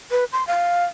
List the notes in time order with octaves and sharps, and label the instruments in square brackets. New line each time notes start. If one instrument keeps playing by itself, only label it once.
[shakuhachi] B4
C6
F5